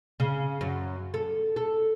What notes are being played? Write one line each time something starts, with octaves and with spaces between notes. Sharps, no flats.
C#3
F#2
A4
A4